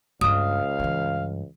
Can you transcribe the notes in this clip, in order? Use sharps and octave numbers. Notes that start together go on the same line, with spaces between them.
C#2 G2 F4 F5 D#6
G2 E3